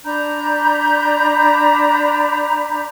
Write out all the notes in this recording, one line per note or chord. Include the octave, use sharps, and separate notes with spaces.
D4 A#5 B5 G6